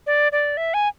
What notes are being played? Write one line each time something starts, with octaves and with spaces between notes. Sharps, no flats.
D5
D5
E5
G#5